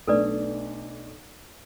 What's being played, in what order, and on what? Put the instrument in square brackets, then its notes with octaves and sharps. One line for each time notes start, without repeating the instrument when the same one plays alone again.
[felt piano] B1 A3 D4 [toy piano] A4 B4 D5